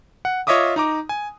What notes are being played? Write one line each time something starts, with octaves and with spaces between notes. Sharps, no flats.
F#5
F4 C#5 D#5 E5 D6 D#6
D#4 A#5 D6
G#5